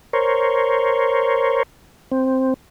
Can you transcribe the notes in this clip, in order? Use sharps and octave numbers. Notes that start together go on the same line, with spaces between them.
A#4 C5 C#5
C4